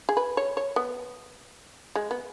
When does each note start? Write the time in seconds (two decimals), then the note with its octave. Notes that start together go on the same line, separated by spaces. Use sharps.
0.09 G#4
0.17 B4
0.37 C#5
0.57 C#5
0.76 B3
1.96 G#3
2.11 B3